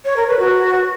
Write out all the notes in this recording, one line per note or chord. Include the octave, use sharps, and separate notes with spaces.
C#5
A#4
B4
F#4